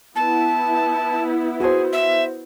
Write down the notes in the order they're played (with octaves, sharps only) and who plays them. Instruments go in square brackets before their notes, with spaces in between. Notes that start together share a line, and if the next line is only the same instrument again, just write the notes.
[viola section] B3 E4 [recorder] A5
[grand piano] F#4 C5 [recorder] G#4
[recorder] E5